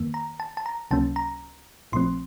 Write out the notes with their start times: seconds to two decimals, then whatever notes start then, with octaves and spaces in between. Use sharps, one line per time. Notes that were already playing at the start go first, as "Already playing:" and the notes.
Already playing: F2 D#3 A#3
0.14 A#5
0.40 A5
0.57 A5
0.66 A#5
0.91 C#2 C3 F#3 A#3 C#4 A5
1.16 A#5
1.92 A#1 A#2 F3 A3 C4 C6